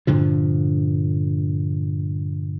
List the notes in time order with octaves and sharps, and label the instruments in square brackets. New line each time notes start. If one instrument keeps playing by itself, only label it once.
[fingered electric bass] G2 A#2 D3 F3